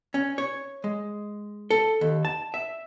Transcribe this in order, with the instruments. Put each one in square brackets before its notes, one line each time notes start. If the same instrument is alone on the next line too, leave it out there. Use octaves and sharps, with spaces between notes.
[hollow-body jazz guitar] C#4
C#5
G#3
A4
D#2
A5
E5